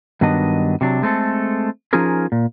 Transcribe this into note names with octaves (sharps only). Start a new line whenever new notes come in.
G2 D#3 F#3 B3 D4 D#5
C3 F#3 D4
G#3 A3 C4 A4
F3 C#4 D#4 F4 G#4 A#4
A#2